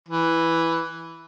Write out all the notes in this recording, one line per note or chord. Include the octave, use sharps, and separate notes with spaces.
E3